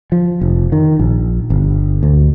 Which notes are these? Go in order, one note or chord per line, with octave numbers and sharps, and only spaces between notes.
F3
F1
D#3
A#1
G1
D2